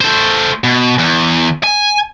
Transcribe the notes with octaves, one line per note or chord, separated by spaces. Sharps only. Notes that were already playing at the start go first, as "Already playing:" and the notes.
A3 C5
B2
E2
G#5